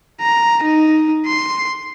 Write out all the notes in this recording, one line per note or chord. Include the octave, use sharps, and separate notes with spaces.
A#5
D#4
C6